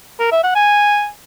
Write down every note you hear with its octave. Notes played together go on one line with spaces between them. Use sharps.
A#4
E5
F#5
G#5